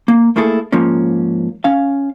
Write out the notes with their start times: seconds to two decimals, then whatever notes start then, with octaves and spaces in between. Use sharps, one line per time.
0.08 A#3
0.36 A3 A#3 E4 G#4 A4
0.72 G#2 F3 A#3 C#4
1.64 C#4 F5